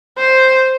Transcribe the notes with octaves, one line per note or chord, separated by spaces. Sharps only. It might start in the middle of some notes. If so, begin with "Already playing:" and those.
C5